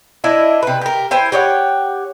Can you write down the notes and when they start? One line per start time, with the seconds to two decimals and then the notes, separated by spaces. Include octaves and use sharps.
0.24 D4 E4 D#5
0.63 C3 B4
0.81 G4 A#4
1.11 E4 C5 G5 G#5
1.32 G4 C#5 D5 F#5